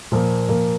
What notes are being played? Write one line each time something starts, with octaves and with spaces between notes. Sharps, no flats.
A#2 F3 A#3
A#2 F3 A#3